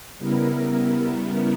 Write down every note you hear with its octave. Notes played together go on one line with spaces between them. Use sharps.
C#3 G3 B3 E4 A#4